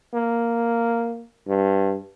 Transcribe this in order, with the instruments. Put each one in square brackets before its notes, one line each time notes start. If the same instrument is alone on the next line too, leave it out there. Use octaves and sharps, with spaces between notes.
[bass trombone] A#3
G2